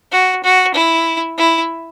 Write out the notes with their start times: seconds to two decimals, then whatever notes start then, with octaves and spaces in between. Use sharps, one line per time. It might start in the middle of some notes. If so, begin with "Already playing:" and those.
0.12 F#4
0.44 F#4
0.75 E4
1.38 E4